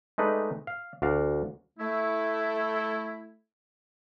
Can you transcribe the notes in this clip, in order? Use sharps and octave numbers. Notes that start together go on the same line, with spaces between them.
G#3 A3 D#4 B4 D5
F5
D2 F#4 D5 F5
A3 E4